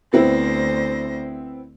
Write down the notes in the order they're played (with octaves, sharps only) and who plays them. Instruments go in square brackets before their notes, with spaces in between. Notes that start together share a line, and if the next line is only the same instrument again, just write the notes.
[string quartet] D2 C5 A#6 [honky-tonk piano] B3 C4 E4